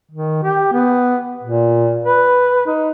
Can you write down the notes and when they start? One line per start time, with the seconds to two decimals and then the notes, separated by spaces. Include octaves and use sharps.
0.11 D#3
0.43 G4
0.73 B3
1.43 A#2
2.04 B4
2.66 D#4